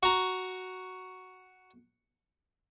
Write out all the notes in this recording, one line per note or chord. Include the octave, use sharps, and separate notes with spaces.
F#4 A#5